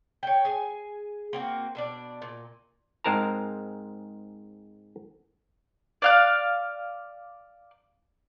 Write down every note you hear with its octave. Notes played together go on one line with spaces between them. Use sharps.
C#5 G5
G#4 G#5
A#3 C4 F#4
B2 D4 D5
A#2
G#2 G#3 C4 A#4 A5 A#5
D5 F5 F#6